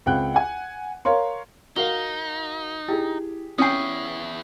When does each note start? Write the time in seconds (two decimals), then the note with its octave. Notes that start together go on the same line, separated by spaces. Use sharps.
0.06 C#2 C4 F#5 G5 F#6
0.34 F#5 G#5
1.05 A#4 C#5 F5 C6
1.76 D#4 F#4 A#4 F5 G7
2.88 E4 G4 G#4
3.58 E2 C#4 E4 G5 D#6 C7